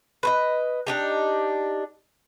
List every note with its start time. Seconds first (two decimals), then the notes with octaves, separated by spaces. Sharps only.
0.23 B4 C5 D#5
0.87 D4 D#4 G4